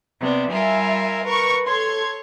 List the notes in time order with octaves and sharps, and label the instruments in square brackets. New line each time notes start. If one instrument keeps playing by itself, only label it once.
[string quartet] C3 B3 D4
[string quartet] G3 F4 A#4 [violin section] E5 G#5
[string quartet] A#4 [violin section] B4 C#6
[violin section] A4 C6 G#6 [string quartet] C#5